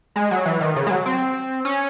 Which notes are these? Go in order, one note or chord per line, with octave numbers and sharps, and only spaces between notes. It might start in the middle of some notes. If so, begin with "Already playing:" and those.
G#3
F#3
E3
D#3
C#3
G#3
F#3
C4
C#4